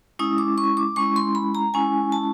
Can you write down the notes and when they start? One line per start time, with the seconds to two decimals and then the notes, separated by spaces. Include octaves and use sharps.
0.19 G#3 C#4 E4 D#6
0.38 D6
0.58 C#6
0.77 D6
0.96 G#3 C#4 E4 C#6
1.16 C6
1.35 B5
1.55 A#5
1.74 G#3 C#4 E4 G#5
2.12 A5